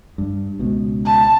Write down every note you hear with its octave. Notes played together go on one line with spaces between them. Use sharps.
G2
C#2 B2
A5